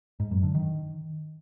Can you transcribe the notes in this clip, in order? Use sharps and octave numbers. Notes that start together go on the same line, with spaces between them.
G#2
F#2
D3
D#3